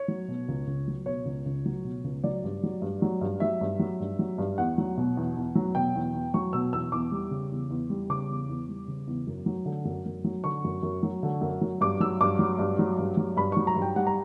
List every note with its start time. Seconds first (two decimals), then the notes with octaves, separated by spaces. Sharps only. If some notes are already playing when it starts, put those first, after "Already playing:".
Already playing: C#5
0.08 F#3
0.28 B2
0.48 C#2
0.67 C#2
0.88 F#3
1.06 B2 C#5
1.25 C#2
1.46 C#2
1.66 F#3
1.84 B2
2.04 C#2
2.24 F#3 D5
2.44 G2
2.63 F#3
2.82 G2
3.02 F#3
3.21 G2
3.40 F#3 E5
3.61 G2
3.79 F#3
4.00 G2
4.19 F#3
4.38 G2
4.58 E2 F#5
4.78 F#3
4.97 B2
5.17 E2
5.37 E2
5.55 F#3
5.75 B2 G5
5.95 E2
6.14 E2
6.34 F#3 C#6
6.53 B2 E6
6.73 E2 E6
6.92 E2 D6
7.12 G3
7.31 C#3
7.51 E2
7.70 E2
7.90 G3
8.09 C#3 D6
8.30 E2
8.49 E2
8.69 G3
8.88 C#3
9.07 E2
9.27 F#2
9.46 F#3
9.65 D3
9.85 F#2
10.06 F#2
10.24 F#3
10.44 D3 C#6
10.64 F#2
10.83 F#2
11.03 F#3
11.23 D3
11.41 F#2
11.61 F#3
11.81 G2 D6
12.00 F#3 E6
12.21 G2 D6
12.39 F#3
12.59 G2
12.79 F#3
12.98 G2
13.17 F#3
13.37 G2 B5
13.52 F#3 C#6
13.67 A#5
13.76 G2
13.82 G5
13.96 G3 F#5
14.07 A#5